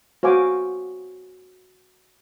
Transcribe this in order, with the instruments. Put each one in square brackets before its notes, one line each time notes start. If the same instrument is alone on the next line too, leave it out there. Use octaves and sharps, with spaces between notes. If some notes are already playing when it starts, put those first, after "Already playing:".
[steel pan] F#4 C5 F5 G#5 D6